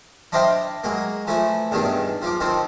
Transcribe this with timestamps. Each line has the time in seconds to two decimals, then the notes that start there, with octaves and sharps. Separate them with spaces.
0.32 D4 E4 C5 D#5 F5 G5
0.83 F#3 G#3 A#3
1.27 E3 F3 A3 E4
1.71 E2 G2 D#3 G3 D4
2.22 F3 F5 D6
2.40 D#3 F3 C4